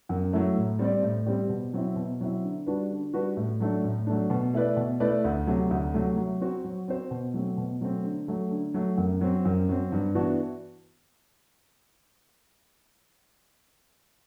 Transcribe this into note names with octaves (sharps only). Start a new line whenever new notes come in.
F#2
F#3 A3 E4
A2
G3 C4 G4 D5
A2
G3 C4 G4 D5
B2
F#3 C4 E4
B2
F#3 C4 E4
D3
G3 D4 F#4 B4
D3
G3 D4 F#4 B4
A2
F#3 A3 D4
A2
F#3 A3 D4
B2
A3 E4 B4 D5
B2
A3 E4 B4 D5
D2
C3 F#3 A3
D2
C3 F#3 A3
F#3
C4 F#4 C5
F#3
C4 F#4 C5
B2
F#3 A3 C4
B2
F#3 A3 C4
D3
F#3 A3
D3
F#3 A3
F#2
F#3 C4
F#2
F#3 C4
G2
E3 B3 D4 F#4